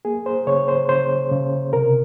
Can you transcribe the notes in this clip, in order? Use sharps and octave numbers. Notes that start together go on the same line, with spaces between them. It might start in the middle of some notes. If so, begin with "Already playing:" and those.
A#3 G#4
C5
C#3 C#5
C5
C#3 C5
C#3
C3 A#4